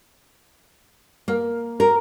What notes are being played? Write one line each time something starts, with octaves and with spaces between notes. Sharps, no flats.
A#3
A#4